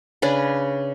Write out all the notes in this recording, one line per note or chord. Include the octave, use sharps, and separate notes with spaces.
C#3 C#4 D4 B4